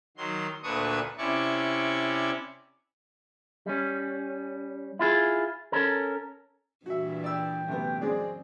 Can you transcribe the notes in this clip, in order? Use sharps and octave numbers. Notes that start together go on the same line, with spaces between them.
D#3 F#3 C6
D2 A#2 D4 B4 C#6 D#6
C3 C#4 E4 D5 C#6
G3 C#4
E4 F4 G#4
C#4 A4 A#4
G2 A#2 E3 F#4 E5
D5 G5 E6
F#2 C3 A3 B3
G#3 C4 G#4 D5